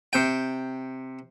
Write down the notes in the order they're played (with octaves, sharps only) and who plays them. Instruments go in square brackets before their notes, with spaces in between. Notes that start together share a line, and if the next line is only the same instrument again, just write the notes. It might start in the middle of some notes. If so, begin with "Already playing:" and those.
[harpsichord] C3 G5